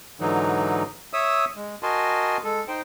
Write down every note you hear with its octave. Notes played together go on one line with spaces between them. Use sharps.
G#2 D3 E3 F#3 D#4
C#5 E5 D#6 E6
G#3
F#4 A#4 D#5 G#5 A5 C6
G#3 A4
D#4 C5 G5